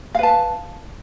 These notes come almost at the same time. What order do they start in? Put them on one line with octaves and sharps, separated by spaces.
F5 B4 A5